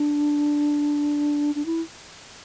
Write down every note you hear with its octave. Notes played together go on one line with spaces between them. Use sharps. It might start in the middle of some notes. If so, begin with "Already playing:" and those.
Already playing: D4
D4
E4